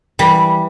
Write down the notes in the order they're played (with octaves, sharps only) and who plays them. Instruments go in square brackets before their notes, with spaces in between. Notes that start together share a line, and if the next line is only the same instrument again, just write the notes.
[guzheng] E3 G3